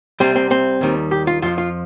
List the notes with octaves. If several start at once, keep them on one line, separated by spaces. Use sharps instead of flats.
C2 C3 G3 C4
C4
C4
D#2 D#3 G3
G4
F4
F2 F3 F4
F4